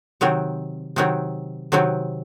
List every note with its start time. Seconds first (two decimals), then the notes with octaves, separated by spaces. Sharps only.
0.21 C3 D#3 F#3 C4
0.96 C3 D#3 F#3 C4
1.72 C3 D#3 F#3 C4